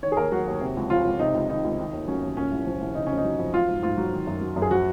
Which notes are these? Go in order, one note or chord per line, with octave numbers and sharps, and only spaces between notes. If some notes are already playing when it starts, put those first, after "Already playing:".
D#3 C#5
G#4
D#2 A#4
F#3 F#4
D#2
C3
C#2
F3 F4
C#2
C3 D#4
C#2
D#3 D#4
C#2
D#3
D#2
F#3 C#4
D#2
A#2 C#4
C2
F3
C2
C#3 D#4
F2 C#4
D#4
F#3
F2
F#3 F4
G#2
G#2 F4
F#3
D#3
F#2
F#3
F#2
G#4
F3 F#4